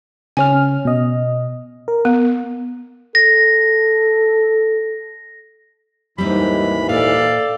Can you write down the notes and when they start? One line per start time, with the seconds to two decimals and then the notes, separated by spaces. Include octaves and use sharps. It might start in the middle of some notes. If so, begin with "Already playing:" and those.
0.37 C#3 C#4 G#5 F6
0.85 B2 D#5
1.88 A#4
2.05 B3
3.15 A4 A#6
6.18 D#2 G#2 E3 G3 C4 D#4 B5
6.89 A#2 A4 D5 F5